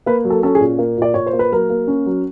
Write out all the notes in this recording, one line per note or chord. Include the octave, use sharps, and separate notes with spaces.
A#3 B4
F#3
A4
C#4 A4
G#4
A#2
A#3
A#2 D5
A#2 C#5
C5
A#3
B4
F#3 A#4
A#3
C#4
F#3